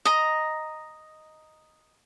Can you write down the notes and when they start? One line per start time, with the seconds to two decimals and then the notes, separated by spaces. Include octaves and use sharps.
0.05 D#5 A#5